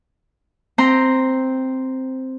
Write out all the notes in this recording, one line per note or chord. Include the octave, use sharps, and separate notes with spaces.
C4 A#5 C6